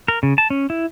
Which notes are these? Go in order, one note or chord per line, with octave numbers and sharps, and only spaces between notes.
A#4
C#3
A5
C#4
E4